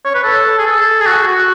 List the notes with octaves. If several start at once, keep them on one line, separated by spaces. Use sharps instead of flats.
C#5
B4
A4
G#4
A4
G#4
F#4
F#4